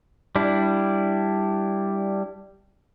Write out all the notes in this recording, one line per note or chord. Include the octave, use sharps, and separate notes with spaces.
G3 D4 E4